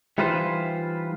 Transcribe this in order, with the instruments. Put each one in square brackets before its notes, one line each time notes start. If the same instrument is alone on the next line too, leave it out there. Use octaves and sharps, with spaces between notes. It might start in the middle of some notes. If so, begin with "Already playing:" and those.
[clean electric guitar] E3 G3 D#4 F4 B4 C5